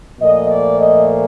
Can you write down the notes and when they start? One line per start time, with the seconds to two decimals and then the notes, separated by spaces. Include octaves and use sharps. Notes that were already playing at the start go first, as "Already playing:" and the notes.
0.21 A#2 F3 A3 D#5
0.50 D5
0.78 D#5